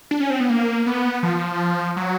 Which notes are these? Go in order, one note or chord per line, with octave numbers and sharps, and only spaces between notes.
D4
C#4
C4
B3
A#3
B3
F3
F#3